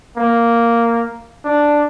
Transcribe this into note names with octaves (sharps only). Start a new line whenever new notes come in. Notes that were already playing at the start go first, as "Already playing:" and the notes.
A#3
D4